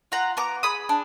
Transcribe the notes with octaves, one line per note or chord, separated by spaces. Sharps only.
F4 F#5 A#5
B3 A#5 D6
G#4 B5 D#6
D4